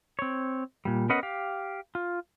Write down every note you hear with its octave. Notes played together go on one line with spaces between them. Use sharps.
C4 C#5
A#2 G3
B3 C#4 A#4 B4 D#5 F#5
G4 F5
F4